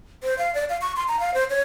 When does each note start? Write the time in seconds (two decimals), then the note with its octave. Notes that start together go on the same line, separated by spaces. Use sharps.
0.23 C5
0.38 F5
0.55 D5
0.69 F5
0.81 C#6
0.96 C6
1.08 A#5
1.20 F5
1.34 C5
1.50 C#5